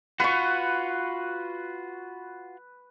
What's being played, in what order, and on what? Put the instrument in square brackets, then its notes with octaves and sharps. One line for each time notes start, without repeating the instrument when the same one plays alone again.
[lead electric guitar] F4 F#4 [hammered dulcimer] B4 C#6